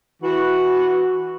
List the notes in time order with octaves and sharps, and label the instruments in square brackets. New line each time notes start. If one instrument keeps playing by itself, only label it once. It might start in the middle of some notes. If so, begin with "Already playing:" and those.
[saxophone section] E3 F#4